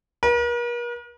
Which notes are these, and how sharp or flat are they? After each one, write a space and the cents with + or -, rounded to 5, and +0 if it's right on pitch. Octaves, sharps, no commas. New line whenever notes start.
A#4 +45